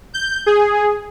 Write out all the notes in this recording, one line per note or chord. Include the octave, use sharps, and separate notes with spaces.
G6
G#4